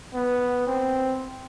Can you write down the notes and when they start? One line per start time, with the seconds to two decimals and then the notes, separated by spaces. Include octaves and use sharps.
0.14 B3
0.67 C4